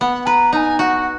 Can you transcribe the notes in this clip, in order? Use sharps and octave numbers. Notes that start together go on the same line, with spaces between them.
B3 F#5
B4 A#5
D#4 G#5 A#5
F#4 F#5